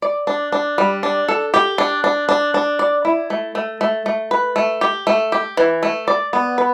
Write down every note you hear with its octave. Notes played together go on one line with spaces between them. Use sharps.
D5
D4
D4
G3
D4
A4
G4
D4
D4
D4
D4
D5
E4
A3
A3
A3
A3
B4
A3
G4
A3
G4
E3
A3
D5
B3
B4